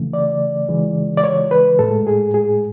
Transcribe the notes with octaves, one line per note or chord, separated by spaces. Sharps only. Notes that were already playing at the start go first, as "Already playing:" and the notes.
Already playing: C#3 E3 A3
D5
C#3 E3 G#3
D5
C#5
B4
A2 G#3 A4
G#4
G#4